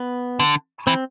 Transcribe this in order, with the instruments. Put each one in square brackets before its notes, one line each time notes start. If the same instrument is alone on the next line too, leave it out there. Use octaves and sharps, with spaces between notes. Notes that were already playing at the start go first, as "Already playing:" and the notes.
Already playing: [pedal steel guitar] B3
[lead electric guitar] D3
[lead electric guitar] E3 [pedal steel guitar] C4